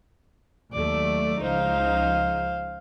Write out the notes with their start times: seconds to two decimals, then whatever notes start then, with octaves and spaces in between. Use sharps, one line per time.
0.73 D#2 F#3 A3 D5
1.43 C#2 F3 D#4 C5 F5